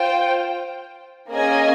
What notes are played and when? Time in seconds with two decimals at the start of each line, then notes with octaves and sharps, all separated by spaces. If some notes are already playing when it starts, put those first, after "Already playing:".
Already playing: F4 C5 G5
1.31 A#3 C#4 G#4 D#5 G#5